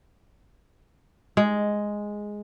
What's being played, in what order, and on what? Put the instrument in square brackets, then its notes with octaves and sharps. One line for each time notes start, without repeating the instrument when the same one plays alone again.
[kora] G#3